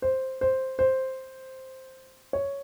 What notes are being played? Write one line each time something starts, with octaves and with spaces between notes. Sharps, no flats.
C5
C5
C5
C#5